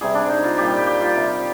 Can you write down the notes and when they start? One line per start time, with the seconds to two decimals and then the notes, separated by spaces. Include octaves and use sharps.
0.01 C3 G3 G#4
0.14 D4
0.29 D#4
0.44 F4
0.58 A#2 G3 G4
0.72 G4
0.86 G4
1.01 F4
1.15 C3 G3